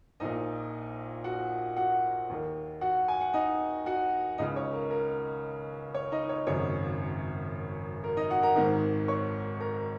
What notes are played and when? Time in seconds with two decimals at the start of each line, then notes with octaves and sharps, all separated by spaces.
0.20 A#1 A#2 D#4 D#5
1.24 F#4 F#5
1.77 F#4 F#5
2.30 D#2 D#3
2.81 F#4 F#5
3.08 G#5
3.21 F#5
3.33 D#4 D#5
3.86 F#4 F#5
4.38 C#2 C#3 D#4 D#5
4.56 C#5
4.73 A#4
4.91 A#4
5.94 C#5
6.12 D#4 D#5
6.29 C#5
6.47 G#1 F#2 C#3 C#5
8.04 A#4
8.17 D#4 D#5
8.30 F#4 F#5
8.43 A#4 A#5
8.56 G#1 G#2 D#3
9.08 C#5 C#6
9.60 A#4 A#5